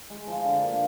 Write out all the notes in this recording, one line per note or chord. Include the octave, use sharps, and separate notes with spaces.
G#3
F3
D3
A#3